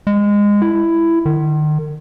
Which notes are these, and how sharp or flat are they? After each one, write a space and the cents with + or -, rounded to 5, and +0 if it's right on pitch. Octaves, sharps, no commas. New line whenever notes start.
G#3 -20
E4 +10
D#3 -40